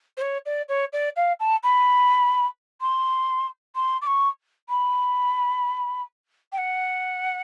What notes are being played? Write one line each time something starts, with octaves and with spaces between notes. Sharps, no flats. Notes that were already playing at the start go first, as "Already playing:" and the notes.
C5
C#5
D5
C#5
D5
F5
A5
B5
C6
C6
D6
C#6
B5
G5
F#5